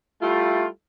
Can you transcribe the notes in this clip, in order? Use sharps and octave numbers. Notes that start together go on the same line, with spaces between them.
G3 A3 E4 F4